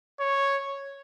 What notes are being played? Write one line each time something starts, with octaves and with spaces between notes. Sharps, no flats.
C#5